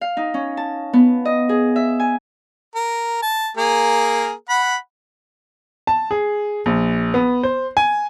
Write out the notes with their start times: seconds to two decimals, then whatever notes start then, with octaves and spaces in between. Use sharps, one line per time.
0.01 F5
0.17 D#4
0.34 C#4
0.57 A5
0.93 B3
1.25 D#5
1.49 G#4
1.76 E5
2.00 G#5
2.75 A#4
3.22 A5
3.57 A#3 G#4 A#4
4.49 F#5 B5
5.87 A5
6.11 G#4
6.66 A#1
7.14 B3
7.43 C5
7.77 G#5